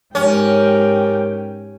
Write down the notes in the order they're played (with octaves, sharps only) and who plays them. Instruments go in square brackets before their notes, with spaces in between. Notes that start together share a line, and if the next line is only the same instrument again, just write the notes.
[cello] G#2 G5 [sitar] C#4 [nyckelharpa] G4 A#4